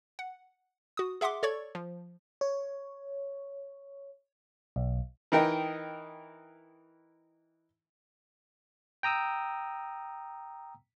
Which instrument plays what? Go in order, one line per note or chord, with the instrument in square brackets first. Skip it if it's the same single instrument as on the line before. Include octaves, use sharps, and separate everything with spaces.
[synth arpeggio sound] F#5
F#4 D#6
G#4 E5 F#5 C6 D6
A4 C#5 D5 C#6 G#6
F3
[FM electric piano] C#5
B1
[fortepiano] E3 D#4 A#4 D#5 G5
[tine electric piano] G5 A#5 D#6 E6